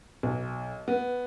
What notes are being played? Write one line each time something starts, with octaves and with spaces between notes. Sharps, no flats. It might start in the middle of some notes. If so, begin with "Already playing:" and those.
B1
B3